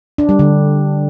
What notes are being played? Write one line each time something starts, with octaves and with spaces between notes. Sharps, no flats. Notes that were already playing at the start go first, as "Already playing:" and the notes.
D4
G3
D3